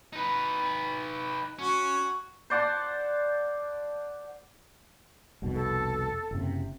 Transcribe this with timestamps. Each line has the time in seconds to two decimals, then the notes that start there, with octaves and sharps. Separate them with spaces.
0.13 D#4 B4
1.59 C#4 F#4
2.50 C5 D5 F#5 A5
5.42 F1 C2 B2
5.55 A4
6.31 F#1 C3